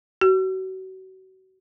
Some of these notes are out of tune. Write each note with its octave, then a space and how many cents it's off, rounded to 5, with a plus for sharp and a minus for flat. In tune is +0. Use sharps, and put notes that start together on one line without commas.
F#4 +35